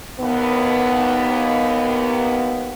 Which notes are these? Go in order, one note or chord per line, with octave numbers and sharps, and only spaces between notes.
D#2 B3